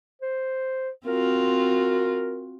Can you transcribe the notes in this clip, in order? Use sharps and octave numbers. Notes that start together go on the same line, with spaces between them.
C5
C4 F4 F#4 A#4